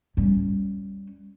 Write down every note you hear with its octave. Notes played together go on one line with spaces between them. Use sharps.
G3 C#4